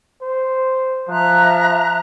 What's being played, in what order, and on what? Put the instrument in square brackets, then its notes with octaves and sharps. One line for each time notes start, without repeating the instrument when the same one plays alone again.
[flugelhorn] C5
[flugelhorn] F3 [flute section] E5 A#5 F#6